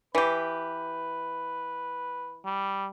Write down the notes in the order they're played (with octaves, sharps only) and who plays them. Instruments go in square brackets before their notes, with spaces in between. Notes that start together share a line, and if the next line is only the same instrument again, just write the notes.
[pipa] E3 G4 [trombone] B4
[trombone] G3